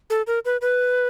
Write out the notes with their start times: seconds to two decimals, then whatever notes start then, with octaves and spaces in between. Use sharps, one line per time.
0.10 A4
0.27 A#4
0.45 B4
0.61 B4